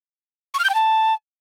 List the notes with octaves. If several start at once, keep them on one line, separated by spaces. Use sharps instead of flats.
C#6
F6
G6
G5
A5